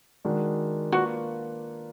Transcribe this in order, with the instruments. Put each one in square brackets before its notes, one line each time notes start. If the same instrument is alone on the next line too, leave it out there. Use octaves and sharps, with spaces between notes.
[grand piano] D#3 G#3 D4 F#4
[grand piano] A#3 D4 F4 B4 [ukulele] F#4